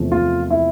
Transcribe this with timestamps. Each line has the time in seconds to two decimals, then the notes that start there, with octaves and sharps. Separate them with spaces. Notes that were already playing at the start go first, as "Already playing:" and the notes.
Already playing: E2 C3 F3 A3
0.12 F4
0.51 E4